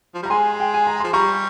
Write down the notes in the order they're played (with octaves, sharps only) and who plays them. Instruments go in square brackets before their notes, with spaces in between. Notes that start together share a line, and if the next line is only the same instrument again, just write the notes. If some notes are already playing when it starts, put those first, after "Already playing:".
[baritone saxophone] F3
[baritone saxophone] G3 [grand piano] A#5
[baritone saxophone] G#3 [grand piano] G#5 C6
[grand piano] G5
G#5
A#5
[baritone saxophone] F3 [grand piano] C6
[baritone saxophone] G3 [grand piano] A#5 C#6